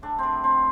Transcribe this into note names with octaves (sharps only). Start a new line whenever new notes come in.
A2 D4
C4 D4
F#3
C4